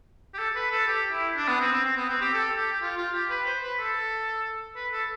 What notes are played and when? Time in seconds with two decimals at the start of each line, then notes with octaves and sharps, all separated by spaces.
0.34 G4
0.38 A4
0.55 B4
0.71 A4
0.87 G4
1.11 E4
1.36 D4
1.48 B3
1.60 C4
1.72 C4
1.84 C4
1.96 B3
2.09 C4
2.21 G4
2.33 A4
2.57 G4
2.72 G4
2.82 F4
2.97 F4
3.14 G4
3.30 B4
3.46 C5
3.62 B4
3.79 A4
4.76 B4
4.92 A4